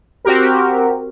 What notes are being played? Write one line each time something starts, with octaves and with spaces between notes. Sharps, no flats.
C4 F#4 G4 A#4